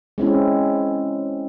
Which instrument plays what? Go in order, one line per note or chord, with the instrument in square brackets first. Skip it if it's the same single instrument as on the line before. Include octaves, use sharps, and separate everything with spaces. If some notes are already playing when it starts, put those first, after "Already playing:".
[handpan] G#3 C4 C#4 E4